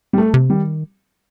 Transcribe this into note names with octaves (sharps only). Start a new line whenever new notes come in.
G3
A3
C3
D#3 G3